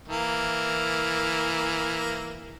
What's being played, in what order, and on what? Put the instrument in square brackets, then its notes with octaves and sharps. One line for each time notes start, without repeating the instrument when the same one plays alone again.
[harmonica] E3 A#3